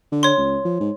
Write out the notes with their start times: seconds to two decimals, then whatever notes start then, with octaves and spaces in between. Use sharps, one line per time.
0.12 D3
0.23 C#5 C6
0.38 C#2
0.65 F3
0.80 G#2